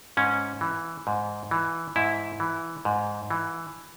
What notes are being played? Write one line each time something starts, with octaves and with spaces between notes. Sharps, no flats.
G#2 C#4
E3
G#2
E3
G#2 E4
E3
G#2
E3